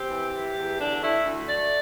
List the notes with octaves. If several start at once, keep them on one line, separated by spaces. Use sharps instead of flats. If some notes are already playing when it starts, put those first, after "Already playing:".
Already playing: C4 G4
E3
E3
E2
D3 D4
A3 E4
D2
A3 D5